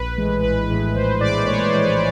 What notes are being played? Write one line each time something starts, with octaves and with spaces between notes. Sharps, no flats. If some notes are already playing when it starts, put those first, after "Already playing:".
Already playing: A#1 B4
A2 E3 G#3
A#1 B4
A2 E3 G#3
A#1 C5
A2 E3 G#3 D5
A#1 C#5
C5
A2 E3 G#3
B4